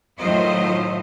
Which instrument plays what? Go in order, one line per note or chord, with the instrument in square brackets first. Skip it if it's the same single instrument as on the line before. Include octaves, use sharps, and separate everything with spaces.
[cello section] A2 D#3 F#3 F4 C5 D#5